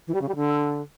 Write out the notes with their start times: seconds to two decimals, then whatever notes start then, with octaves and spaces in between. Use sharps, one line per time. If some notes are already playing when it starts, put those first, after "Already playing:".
0.07 E3
0.14 G3
0.21 C#3
0.28 G3
0.35 D3